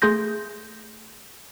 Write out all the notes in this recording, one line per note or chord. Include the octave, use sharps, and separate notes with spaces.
A3 G#4 C6 G6 A#6